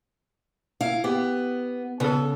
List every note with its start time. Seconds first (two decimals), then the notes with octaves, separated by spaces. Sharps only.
0.81 E4 F5
1.04 B3 G4
2.00 C#3 B3 A4